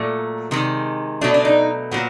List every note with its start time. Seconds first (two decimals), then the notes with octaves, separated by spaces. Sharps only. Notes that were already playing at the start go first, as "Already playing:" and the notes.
Already playing: A#2 F#3 A3
0.51 C3 D#3 G#3
1.21 B2 F#3 A3 D4
1.34 D4
1.45 D#4
1.91 A#2 F#3 B3